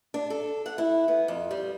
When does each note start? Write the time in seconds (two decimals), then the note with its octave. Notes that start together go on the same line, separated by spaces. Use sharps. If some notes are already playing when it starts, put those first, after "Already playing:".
0.14 D4
0.30 A4
0.66 F#5
0.78 E4
1.08 B3
1.28 F2
1.51 G3